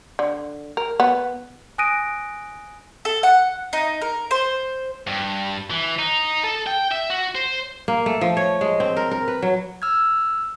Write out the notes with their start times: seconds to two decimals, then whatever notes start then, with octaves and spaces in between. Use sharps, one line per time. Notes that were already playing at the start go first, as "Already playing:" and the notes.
0.19 D3
0.77 A#4
1.00 B3
1.78 G#5 D#6 F#6 A#6 D7 D#7
3.05 A4
3.23 F#5
3.73 D#4
4.01 A#4
4.31 C5
5.07 G2
5.70 E3
5.99 D#4
6.44 A4
6.67 G5
6.92 E5
7.10 F#4
7.35 C5
7.88 A#3
8.06 A3
8.21 F3
8.37 C#5
8.61 G#3
8.80 C4
8.96 A#4
9.11 A#4
9.28 B4
9.42 F#3
9.82 E6 F6 G#6